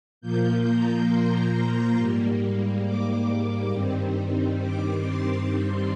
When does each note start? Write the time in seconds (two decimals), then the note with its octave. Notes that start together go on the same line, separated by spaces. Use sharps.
0.21 A#2 F3 A#3 G6
0.64 A#5
1.09 C6
1.96 G#2 G3 A#3
2.84 D6
3.71 G2 D#3 G3 C4
4.59 D6
5.04 C6
5.48 G2 D#3 G3 C4